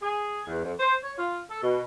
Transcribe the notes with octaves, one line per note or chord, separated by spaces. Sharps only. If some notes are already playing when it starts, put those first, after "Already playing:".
G#4
E2
F2
C5
C#5
F4
A4
B2